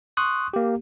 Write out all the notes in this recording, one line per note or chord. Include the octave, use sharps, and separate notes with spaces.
C6 C#6 D#6 F#6
A#3 G4